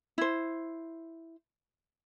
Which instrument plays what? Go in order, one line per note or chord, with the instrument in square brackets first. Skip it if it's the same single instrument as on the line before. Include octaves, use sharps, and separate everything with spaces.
[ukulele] E4 C5